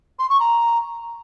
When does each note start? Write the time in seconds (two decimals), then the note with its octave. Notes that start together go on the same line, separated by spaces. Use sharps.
0.19 C6
0.29 C#6
0.39 A#5